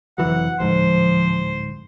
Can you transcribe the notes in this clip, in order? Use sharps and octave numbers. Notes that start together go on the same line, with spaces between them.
F1 E3 F#3 F#5
D1 G#2 F3 C5